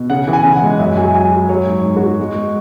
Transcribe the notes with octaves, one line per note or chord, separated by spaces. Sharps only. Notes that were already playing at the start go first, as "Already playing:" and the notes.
Already playing: B2
C#3 F#5
E3
G#5
C#3
F#5
G#3
F#2 E5
F#3 G#5
F#3 G#5
F#3
F#3 C#5
G#2
G#2
F#4
F#3
G#3
G#3